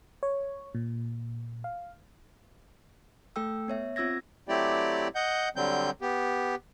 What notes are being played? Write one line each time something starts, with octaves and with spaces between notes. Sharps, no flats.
C#5
A#2
F5
A3 A4 G5 E6
B3 C#5 E5
C4 F4 E6 G#6 A#6
F#3 A3 C4 E4 G4 D5
D#5 F#5 G6
D3 F#3 G3 C4 G6
B3 G4